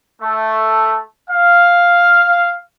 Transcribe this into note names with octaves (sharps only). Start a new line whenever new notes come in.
A3
F5